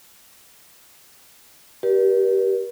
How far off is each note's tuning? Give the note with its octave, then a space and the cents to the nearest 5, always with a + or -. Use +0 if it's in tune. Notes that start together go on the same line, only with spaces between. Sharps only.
G4 -20 A#4 +45 D5 +0